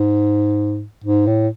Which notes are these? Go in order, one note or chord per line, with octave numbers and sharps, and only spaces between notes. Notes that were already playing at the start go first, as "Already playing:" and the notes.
Already playing: G#2
G#2
A2